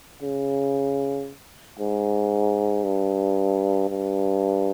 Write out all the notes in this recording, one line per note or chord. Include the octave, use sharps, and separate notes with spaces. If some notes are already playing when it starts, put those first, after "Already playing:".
C#3
G#2
G2
G2